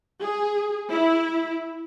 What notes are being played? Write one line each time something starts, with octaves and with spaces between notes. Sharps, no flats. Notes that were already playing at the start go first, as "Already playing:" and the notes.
G#4
E4